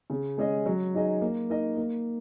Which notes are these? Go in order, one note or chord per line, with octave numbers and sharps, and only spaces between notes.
C#3
G#3 C#4 G#4 D#5
F#3
D#4 G#4 D#5
A#3
D#4 A#4 D#5
A#3